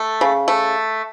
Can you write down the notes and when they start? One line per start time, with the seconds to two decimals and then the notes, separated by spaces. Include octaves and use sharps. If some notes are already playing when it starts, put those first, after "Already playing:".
Already playing: A3
0.21 C#3
0.48 A3